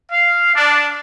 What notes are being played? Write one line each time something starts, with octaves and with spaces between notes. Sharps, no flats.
F5
D4